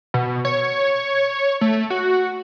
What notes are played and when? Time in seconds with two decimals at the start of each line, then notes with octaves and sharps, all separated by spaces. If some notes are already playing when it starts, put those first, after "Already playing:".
0.14 B2
0.45 C#5
1.61 A3
1.90 F#4